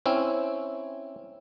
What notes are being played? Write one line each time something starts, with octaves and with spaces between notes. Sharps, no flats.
C4 C#4 E4